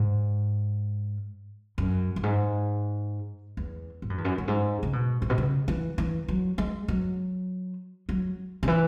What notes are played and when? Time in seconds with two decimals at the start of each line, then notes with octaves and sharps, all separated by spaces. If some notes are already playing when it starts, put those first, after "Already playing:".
Already playing: G#2
1.78 F#2
2.16 F#2
2.23 G#2
3.57 E2
4.02 G#2
4.10 F#2
4.18 E2
4.25 F#2
4.38 F#2
4.48 G#2
4.83 C#3
4.93 B2
5.22 G#2
5.30 B2
5.38 C#3
5.68 E3
5.98 E3
6.28 F#3
6.58 G#3
6.88 F#3
8.09 F#3
8.63 C#3
8.67 E3